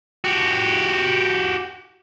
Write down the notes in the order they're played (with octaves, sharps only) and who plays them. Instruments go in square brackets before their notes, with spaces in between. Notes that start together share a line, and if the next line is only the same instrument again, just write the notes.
[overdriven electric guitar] F#4 G4